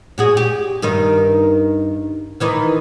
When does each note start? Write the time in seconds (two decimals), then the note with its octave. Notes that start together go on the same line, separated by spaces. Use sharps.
0.18 A#2 F#4 G#4
0.37 G4
0.82 G2 D#3 D#4
2.40 D#3 E3 D#4